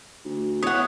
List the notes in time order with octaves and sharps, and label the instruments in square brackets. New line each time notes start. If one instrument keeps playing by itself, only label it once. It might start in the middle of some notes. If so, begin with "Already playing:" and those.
[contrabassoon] D2
[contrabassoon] E2 [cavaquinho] C#5 F#5 [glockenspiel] D#6